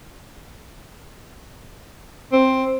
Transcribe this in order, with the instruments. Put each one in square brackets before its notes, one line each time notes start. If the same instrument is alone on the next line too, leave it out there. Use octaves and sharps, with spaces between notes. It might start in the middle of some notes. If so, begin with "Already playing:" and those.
[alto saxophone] C4